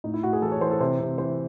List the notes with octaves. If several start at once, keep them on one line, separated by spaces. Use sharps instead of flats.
A2 D#4
E4
A2 F#4
G#4
E3 A4
C#5
E3 C5
A4
C3 C5
C3
E3 C5